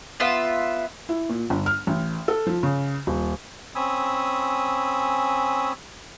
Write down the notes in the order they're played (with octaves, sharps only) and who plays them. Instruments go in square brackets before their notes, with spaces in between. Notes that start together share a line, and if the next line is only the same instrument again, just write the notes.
[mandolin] B3 F4 E5
[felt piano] E4
A#2
G1
F6
A1
A4
F3
C#3
D#1
[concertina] C4 C#4 G#5 B5 D#6 E6